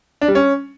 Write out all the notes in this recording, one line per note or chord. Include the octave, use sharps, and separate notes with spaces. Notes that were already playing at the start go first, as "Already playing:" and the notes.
D4
G3
C#4